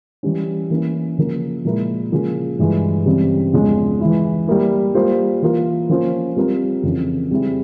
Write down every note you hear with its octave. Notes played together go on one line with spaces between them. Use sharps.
E3 G3 C#4
E3 A#3 C#4
C#3 F3 A#3
A#2 F3 G#3 E4 A#4
C#3 F3 A#3 F4 G#4
G2 E3 G#3
C#3 E3 G3 C4
E2 C#3 F3 G#3
E3 G#3 E4
G3 A#3 E4
G3 A#3 F4 C5
E3 A#3 F4 A#4
F3 A#3 C#4 F4 C5
G3 C4 F4 A#4
F2 C#3 E3
G3 C4 E4 G#4